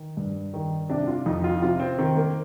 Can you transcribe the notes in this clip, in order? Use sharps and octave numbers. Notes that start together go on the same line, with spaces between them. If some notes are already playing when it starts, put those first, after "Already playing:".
Already playing: D#3
G2
D#3
C3 D4
F4
F2 D#4
F4
C3 F4
C4
D#3 C4
A#3